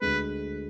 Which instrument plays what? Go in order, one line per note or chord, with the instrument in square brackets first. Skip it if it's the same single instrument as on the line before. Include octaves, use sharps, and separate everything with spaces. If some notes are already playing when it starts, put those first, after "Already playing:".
[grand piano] D2 D3 G#3 [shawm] B4